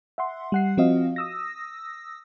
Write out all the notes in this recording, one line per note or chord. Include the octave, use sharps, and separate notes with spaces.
E5 F#5 C6
G3 F#5 C7
F3 C4 F#4 D#5 F5
D#6 E6 A#6